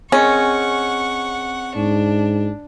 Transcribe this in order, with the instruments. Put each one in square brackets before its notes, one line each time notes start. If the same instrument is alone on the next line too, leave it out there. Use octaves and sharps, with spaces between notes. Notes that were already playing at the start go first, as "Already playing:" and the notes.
[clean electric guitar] C4 G#4 D#5 [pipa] C#4 [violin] F#5 C#6
[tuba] G#2 [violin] D4